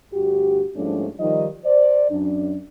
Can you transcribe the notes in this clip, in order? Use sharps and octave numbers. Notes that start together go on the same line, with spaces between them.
D2 G2 F#4 G4
G#2 F3 G3 A3 C#4 D4
D#3 F3 G3 D#4 D#5
C5 D5
F#2 D4